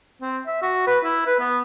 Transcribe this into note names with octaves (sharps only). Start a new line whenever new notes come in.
C4
E5
F#4
B4
E4
B4
B3